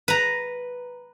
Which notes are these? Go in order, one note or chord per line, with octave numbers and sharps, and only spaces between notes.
B4 A#5